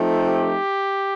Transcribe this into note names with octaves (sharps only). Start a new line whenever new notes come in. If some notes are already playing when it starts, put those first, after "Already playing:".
Already playing: F3 A3 C4 D#4
G4